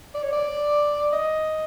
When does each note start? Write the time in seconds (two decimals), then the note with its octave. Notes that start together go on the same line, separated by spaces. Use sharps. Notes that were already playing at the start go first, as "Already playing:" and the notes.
0.14 D5
0.23 C#5
0.32 D5
1.13 D#5